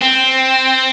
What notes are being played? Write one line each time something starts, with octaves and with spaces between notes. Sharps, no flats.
C4